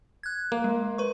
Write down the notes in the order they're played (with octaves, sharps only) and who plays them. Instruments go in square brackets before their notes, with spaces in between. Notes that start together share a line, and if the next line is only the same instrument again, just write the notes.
[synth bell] F#6 G#6
[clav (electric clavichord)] A#3
[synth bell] G#3
B4 C#6